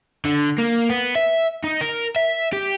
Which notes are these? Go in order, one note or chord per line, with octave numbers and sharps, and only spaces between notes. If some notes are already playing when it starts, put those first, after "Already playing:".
D3
A#3
B3
E5
D#4
A#4
E5
G4